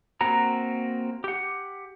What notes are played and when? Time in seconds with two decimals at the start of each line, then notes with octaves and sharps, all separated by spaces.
0.21 A#3 C4 F#4 A#5
1.24 G4 F#5